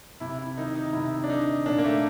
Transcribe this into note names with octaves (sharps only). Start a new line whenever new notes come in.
C3 E4
E4
D#3 D#4
D#4
C3 E4
D4
D#3 D#4
A#2 D4
A#3
A3